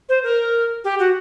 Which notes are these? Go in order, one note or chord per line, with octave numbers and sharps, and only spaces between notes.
C5
A#4
G4
F#4